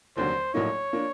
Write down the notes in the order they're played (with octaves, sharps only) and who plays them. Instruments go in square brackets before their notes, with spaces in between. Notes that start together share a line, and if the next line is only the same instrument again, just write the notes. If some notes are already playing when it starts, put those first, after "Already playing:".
[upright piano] F1 D#2 D3 F#3 [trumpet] C5
[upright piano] A#1 A2 F#3 A#3 D#4 [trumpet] C#5
[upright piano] F3 A#3 D4